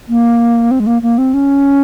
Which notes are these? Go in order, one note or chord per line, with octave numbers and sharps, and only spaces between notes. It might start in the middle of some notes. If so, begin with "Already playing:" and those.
A#3
C4
G#3
A#3
A#3
C4
C#4